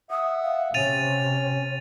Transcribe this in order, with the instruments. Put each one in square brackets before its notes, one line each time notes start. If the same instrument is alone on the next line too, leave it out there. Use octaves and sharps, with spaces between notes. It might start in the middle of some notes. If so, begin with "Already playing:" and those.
[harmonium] E5 F#5 [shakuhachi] D#6
[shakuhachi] F5
[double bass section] C3 [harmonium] C#4 [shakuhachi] C#5 [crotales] A6 D#7 F7